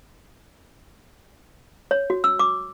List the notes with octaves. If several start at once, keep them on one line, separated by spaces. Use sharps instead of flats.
C#5
F#4
E6
D6